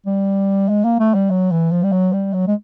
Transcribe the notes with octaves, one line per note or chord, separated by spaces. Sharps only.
G3
G#3
A#3
A3
G3
F#3
E3
F3
G3
F#3
G3
F#3
G#3